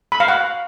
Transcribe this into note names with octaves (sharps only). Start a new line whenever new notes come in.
B5
F5
F#5